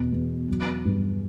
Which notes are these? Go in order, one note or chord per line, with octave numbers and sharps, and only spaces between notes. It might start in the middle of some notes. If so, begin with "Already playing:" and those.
Already playing: E2 B2
E2
F#3
G2